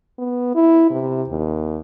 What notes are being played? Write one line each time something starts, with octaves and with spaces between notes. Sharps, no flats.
B3
E4
C3
D#2